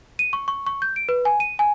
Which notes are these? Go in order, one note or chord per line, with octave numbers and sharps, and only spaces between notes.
D#7
C#6
C#6
C#6
G6
D7
B4
G#5
D#7
G#5